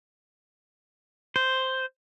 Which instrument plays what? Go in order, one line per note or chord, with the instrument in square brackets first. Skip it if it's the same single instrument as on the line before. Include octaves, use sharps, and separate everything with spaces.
[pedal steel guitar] C5